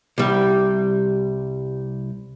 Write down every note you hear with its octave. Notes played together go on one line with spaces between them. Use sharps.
C2 G3